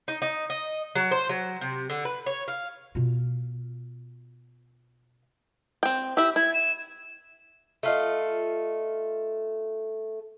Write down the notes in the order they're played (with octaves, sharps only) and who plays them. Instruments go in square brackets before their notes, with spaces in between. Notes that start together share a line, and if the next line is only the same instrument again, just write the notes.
[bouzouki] D#4
D#4
D#5
F#3
C5
F#3
C3
D3
B4
C#5
F5
[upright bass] B2 F4
[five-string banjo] C4 G5
[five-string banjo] E4 G4 [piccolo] E6
[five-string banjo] E4 [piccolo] G#6
[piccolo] E7
[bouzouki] A3 F4 D#5